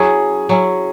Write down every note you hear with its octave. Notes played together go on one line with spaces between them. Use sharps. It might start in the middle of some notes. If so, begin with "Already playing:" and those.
Already playing: F#3 C#4 E4 G#4
F#3 C#4 E4